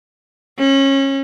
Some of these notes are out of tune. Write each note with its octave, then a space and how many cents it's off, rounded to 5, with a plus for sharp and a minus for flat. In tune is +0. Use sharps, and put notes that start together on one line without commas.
C#4 -25